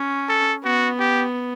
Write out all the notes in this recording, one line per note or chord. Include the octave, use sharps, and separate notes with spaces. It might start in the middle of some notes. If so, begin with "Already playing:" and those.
Already playing: C#4
A4
B3 F#4
G4